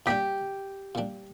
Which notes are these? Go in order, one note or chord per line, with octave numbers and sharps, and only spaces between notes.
A#2 G3 D4 G4
A#2 G3 D4